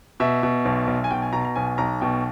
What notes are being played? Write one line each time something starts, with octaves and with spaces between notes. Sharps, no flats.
B2 E5
B2
B1
B1
G#5
B2 G5
G#5
B2 A#5
A#5
B1 G#5
B1 A#5
B2 G5